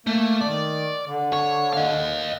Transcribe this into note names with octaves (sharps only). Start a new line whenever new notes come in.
A3 A#3
D#3 D5
D3
C#5
D#5 F5